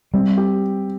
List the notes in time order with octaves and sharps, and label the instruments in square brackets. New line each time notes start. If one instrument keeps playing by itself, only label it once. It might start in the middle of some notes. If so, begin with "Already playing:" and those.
[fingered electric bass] G3 [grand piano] C4
[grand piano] G4